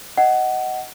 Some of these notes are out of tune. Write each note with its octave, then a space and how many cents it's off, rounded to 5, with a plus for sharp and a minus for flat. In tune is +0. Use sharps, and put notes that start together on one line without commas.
D#5 +5 F#5 +15